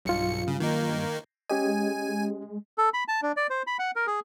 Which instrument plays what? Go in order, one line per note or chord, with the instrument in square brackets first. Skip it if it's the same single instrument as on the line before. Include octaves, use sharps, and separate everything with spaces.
[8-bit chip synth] B1 C#7 [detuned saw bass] G2 [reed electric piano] F#3 F4
[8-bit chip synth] C#3
D#3 A#3 D#4
[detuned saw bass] G#3 [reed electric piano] C#4 G4 D#5 [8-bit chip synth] G#5
[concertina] A4
B5
A5
D4
D5
C5
B5
F#5
A#4
G#4